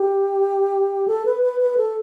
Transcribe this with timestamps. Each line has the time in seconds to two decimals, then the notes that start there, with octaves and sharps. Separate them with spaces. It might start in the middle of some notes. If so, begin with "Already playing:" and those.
Already playing: G4
1.08 A4
1.25 B4
1.43 B4
1.61 B4
1.77 A4